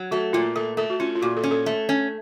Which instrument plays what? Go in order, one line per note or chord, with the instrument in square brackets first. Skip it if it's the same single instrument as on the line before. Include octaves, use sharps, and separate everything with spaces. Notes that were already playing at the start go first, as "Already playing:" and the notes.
Already playing: [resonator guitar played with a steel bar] F#3
[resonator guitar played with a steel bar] A3 [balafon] F#4
[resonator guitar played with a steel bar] A#2 [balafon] F4
[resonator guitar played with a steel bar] A3 [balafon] A4
[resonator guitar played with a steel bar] A3 [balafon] A4
[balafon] F#4
[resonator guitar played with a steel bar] C#4 [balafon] F4
[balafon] F4
[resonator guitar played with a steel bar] A#2 [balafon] F#4
[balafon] A4
[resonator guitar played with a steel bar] C#4
[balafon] A4
[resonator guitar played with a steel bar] A3
C#4